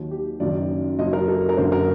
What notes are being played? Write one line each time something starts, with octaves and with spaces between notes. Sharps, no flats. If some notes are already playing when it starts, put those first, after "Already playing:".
Already playing: D#2 D#3 F#3
G4
F#1 F#2 D#3 F#3 D5
F#1 F#2 F#3 D#5
A#4
A4
A#4
F#1 F#2 D3 C5
A#4